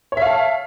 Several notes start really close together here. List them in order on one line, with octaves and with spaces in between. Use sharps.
C#5 E5 F5 A5